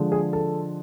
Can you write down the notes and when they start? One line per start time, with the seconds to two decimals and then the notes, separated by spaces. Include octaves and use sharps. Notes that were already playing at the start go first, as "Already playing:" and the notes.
Already playing: D3 F3 G#3
0.12 G#4
0.33 A4